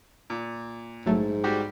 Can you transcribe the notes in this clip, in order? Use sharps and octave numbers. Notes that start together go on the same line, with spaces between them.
A#2
A#1 G#2 F#3 A3
G3 F#4 G4